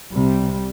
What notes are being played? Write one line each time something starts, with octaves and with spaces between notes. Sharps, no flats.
C2 C3 G3